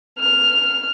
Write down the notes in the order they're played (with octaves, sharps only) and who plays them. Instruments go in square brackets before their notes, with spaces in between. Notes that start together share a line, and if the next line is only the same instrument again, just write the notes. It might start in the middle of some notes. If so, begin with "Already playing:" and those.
[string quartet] F6